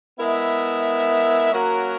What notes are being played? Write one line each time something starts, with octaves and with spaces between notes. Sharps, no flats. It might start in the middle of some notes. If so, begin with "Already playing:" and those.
G#3 B3 E4 A#4 E5
F#3 A#3 C#4 F#4 A#4